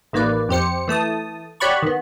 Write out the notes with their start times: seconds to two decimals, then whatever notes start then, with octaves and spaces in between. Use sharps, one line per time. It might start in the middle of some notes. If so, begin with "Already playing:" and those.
0.13 A1 D#3 A#3 B4 D5
0.49 F2 G4 C5 C#7
0.88 E3 A3 A5 D#6
1.60 G4 C#5 D5 F#5 B5 C#6
1.82 D#3 B3